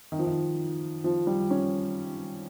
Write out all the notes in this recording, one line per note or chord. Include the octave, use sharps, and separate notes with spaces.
D#3
F3
D#3
F3
G3
C#4